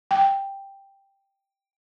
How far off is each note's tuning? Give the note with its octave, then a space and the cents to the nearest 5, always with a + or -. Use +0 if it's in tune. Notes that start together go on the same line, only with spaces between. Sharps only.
G5 +5